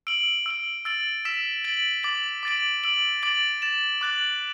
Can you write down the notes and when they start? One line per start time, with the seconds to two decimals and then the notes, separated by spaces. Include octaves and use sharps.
0.07 E6 D7 F#7
0.46 E6 D7 F#7
0.85 E6 A6 D7 F#7
1.25 E6 B6 E7
1.64 A6 D7 F#7
2.03 D6 A6 F#7
2.43 D6 A6 D7 F#7
2.84 E6 D7 F#7
3.23 D6 A6 D7 F#7
3.62 A6 E7
4.01 D6 F#6 A6 F#7